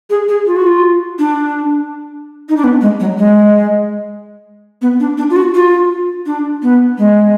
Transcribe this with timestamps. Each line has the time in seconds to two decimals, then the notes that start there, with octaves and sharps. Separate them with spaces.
0.10 G#4
0.29 G#4
0.47 F4
0.56 F#4
0.67 F4
1.19 D4
2.49 D#4
2.57 D4
2.64 B3
2.81 G#3
3.00 F#3
3.18 G#3
4.82 B3
5.00 D4
5.18 D4
5.30 F4
5.36 F#4
5.55 F4
6.26 D4
6.63 B3
6.98 G#3